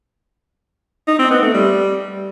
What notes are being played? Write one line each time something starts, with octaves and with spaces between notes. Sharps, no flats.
D#4
C4
B3
A3
G3